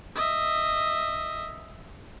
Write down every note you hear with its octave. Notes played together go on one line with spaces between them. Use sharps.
D#5 E5